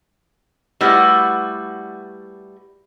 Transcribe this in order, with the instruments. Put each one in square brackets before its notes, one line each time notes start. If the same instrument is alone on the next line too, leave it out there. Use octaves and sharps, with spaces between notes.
[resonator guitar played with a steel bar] G3 A3 E4 F#4 B4 D5